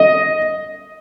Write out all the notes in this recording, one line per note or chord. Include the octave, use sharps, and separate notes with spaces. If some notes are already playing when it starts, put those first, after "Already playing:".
Already playing: D#5